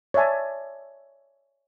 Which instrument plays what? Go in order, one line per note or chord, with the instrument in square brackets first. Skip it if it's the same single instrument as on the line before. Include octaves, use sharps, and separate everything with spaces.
[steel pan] C#5 D5 E5 G#5 A5